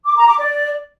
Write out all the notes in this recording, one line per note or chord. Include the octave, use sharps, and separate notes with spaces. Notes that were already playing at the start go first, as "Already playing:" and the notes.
D6
A#5
D6
D5